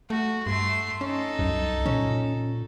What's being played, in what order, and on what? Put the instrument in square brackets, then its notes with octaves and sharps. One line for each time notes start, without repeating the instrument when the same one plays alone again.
[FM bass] A3 [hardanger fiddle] F#4
[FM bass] G2 [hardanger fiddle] A3 C6
[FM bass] C#4 [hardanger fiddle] D#4 A4
[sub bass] C2 [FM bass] F#2
[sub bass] A#2 [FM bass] C#4